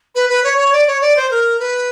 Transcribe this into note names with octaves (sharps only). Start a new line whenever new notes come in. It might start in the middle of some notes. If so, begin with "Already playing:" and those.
B4
B4
C#5
C#5
D5
C#5
D5
C5
A#4
B4